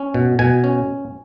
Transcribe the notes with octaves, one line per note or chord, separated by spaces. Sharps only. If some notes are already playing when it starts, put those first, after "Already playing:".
Already playing: C#4
B2
B2 G#5
C#4